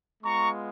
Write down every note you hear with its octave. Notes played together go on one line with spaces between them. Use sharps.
G#3 B3 F4 A#5 C#6